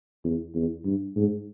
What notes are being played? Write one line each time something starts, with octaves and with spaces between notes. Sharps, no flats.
E2
E2
G2
G#2